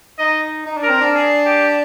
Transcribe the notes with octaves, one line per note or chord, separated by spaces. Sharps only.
D#4 D#5
D#4
D4
A#4
C4
D4
G#4
G4